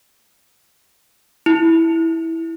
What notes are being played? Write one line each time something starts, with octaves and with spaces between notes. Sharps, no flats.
E4